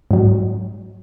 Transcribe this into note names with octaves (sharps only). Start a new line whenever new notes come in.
G#2 F#3